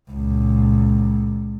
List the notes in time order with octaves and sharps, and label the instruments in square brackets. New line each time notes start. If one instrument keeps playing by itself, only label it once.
[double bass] C#2 A#2